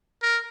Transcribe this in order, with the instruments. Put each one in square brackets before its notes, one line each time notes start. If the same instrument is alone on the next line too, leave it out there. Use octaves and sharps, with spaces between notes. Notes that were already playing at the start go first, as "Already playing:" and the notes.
[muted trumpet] A#4